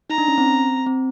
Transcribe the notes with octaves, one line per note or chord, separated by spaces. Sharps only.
D#4 A#5
D4
C#4
C4
C4